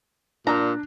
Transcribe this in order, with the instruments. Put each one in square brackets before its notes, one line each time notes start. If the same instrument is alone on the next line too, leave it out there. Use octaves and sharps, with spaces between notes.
[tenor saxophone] A#2 [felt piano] D4 [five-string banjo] A#5